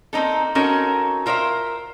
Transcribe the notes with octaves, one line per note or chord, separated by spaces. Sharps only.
A#3 C4 D#4 A4
C4 C#4 D#4 F#4 A4 A#4
F4 A#4 C5 D5 E5